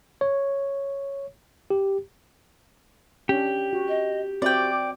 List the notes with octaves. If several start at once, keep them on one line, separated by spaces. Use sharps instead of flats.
C#5
G4
C#4 D4 G4
F#4
D#5
C4 F#4 D5 E5 G5 D6